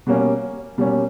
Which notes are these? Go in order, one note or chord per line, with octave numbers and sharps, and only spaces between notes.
B2 G3 A#3 C#4
B2 G3 A#3 C#4